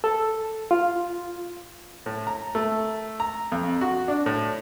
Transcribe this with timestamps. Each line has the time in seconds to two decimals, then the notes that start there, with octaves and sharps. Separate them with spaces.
0.04 A4
0.71 F4
2.06 A2
2.27 A#5
2.55 A3
3.20 A#5
3.52 F2
3.81 F#4
4.08 D4
4.26 A2